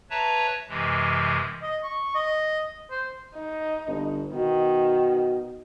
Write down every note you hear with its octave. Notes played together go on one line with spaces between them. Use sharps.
B4 C#5 E5 A5 A#5
F#2 C3 E3 G#3
D#5
C#6
D#5
C5
D#4
G1
B2 D#3